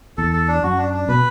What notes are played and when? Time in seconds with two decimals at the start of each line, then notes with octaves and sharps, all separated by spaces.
0.18 E2 A4
0.33 A4
0.48 D4
0.63 F#2 F#4
0.78 D4
0.94 D4
1.09 B2 B4